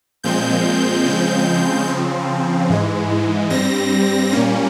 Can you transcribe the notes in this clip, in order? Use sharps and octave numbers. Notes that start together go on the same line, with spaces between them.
A#2 F3 G#3 C4 G6
C#3 F3 G#3 C4
C#3 F3 C4
G#2 E3 G#3
G2 G3 C4 A#6
A#2 G3 A#3 C#4